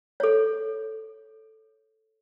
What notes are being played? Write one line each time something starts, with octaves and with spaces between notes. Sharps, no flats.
A4 C#5